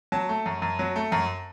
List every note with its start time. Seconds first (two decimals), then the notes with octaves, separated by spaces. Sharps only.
0.12 F#3 A5
0.29 A3
0.46 F#2
0.62 F#2
0.79 F#3
0.96 A3
1.12 F#2